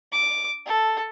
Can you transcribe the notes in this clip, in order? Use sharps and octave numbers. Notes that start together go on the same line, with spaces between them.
D6
A4